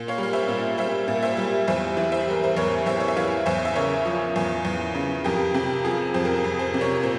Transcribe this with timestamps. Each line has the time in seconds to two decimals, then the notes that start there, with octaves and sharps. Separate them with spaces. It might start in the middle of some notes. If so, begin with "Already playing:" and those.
Already playing: A#2
0.08 C#5 F5
0.18 G3
0.23 F5
0.33 C5 E5
0.48 A#2
0.78 G3 C5 E5
1.08 A#2
1.23 C5 E5
1.37 G3
1.67 E2 C5 E5
1.97 E3
2.12 C5 E5
2.27 G3 A#4
2.44 C5
2.57 E2 A#4 C#5
2.86 E2 C5 E5
3.00 C#5
3.08 E5
3.17 E3 C#5 F5
3.46 E2 C5 E5
3.65 E5
3.75 C#3 A#4 C#5
4.06 F3
4.36 E2
4.65 E2
4.95 C#3
5.24 F2 G4 A#4
5.54 C3 G4
5.84 F3 G#4
6.14 F2 C5
6.25 A#4
6.36 G#4
6.44 F2
6.59 G#4 C5
6.74 C3
6.81 A#4 C#5
7.03 A#2 C5